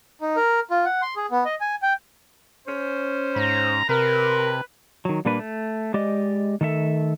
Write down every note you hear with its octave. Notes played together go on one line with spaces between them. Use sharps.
D#4
A#4
F4
F#5
C6
G#4
B3
D#5
G#5
G5
C#4 C5
G#2 A#5
C3 A#4 B4
D#3 F#3
A#2 G3 A#3 D4 B4
A3
G#3 G4 D5 D#5
D#3 A3 A4 E5